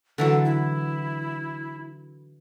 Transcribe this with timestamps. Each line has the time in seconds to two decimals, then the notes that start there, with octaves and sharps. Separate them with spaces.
0.18 D3 E3 F#3 A4
0.45 E4